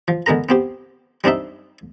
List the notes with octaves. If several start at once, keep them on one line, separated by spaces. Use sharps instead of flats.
F3
D3 G#3 B3 A#4 A#5
B3 C4 G4
G3 C4 D4 D#4 E5